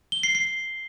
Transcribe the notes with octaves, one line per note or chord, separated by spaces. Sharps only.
G7
C7
C7